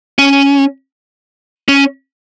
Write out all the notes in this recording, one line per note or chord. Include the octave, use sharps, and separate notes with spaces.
C#4
C#4